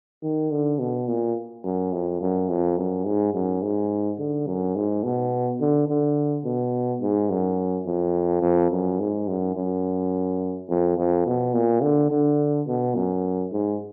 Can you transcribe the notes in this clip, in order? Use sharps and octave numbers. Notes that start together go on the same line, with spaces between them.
D#3
D3
B2
A#2
F#2
F2
F#2
F2
F#2
G#2
F#2
G#2
D3
F#2
G#2
B2
D3
D3
B2
G#2
F#2
F2
F2
F#2
G#2
F#2
F#2
F2
F2
B2
A#2
D3
D3
B2
F#2
G#2